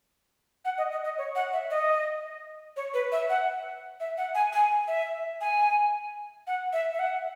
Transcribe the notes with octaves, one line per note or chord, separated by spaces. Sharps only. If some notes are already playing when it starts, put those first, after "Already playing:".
F#5
D#5
D#5
D#5
C#5
F#5
E5
D#5
C#5
B4
E5
F#5
E5
F#5
G#5
G#5
E5
G#5
F#5
E5
E5
F#5